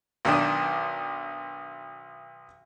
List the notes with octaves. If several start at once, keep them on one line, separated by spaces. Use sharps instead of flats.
B1 D#3 D4 D#6